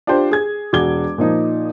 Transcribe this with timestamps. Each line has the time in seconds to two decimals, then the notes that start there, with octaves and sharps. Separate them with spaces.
0.07 D4 F4 G4 C5
0.31 G#4 G#6
0.73 E1 F#4 G#4 D6 G#6 G7
1.18 A#2 F3 D#4